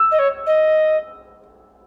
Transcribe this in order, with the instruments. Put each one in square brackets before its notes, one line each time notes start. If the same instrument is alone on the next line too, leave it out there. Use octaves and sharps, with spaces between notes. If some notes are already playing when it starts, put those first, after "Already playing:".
Already playing: [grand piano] E6
[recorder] D#5
C#5
D#5